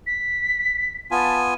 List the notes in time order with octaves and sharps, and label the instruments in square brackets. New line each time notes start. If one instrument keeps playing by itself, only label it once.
[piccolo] B6
[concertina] B3 F4 G#5 [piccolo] A5